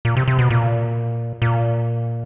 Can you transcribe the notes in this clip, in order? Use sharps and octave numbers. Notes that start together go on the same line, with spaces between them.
A#2
C3
C3
B2
A#2
A#2